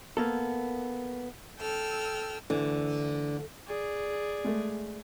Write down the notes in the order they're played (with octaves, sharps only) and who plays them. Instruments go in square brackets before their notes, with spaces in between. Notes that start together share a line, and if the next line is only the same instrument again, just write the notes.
[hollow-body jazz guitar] A#3 B3 A4
[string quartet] A4 G5 E6 F6
[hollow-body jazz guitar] D2 E3 [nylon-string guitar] D3
[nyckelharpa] G#4 D5
[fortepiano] G#3 A3